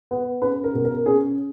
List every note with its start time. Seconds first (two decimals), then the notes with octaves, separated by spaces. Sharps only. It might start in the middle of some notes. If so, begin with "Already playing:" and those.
0.11 B3
0.42 C#4 B4
0.64 A#4
0.74 B2
0.85 A#4
1.06 C#4 G#4